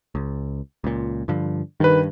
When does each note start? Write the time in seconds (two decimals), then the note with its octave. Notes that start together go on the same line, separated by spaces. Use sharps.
0.15 C#2
0.84 C#2 A#2
1.28 G2 D3 F3
1.80 G2 D#3 B4